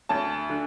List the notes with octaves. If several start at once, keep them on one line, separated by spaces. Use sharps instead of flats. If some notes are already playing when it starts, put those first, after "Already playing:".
D2 A5
D3